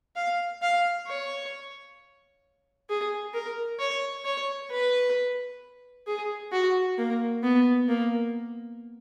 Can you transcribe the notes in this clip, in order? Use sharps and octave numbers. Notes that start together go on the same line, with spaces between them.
F5
F5
C#5
G#4
A#4
C#5
C#5
B4
G#4
F#4
A#3
B3
A#3